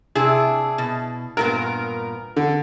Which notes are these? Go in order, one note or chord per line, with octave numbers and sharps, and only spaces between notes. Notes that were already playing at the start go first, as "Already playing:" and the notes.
C3 D4 E4 G#4
B2
G2 A#2 B3 A#4
D3